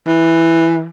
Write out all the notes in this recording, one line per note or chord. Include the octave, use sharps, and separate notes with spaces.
E3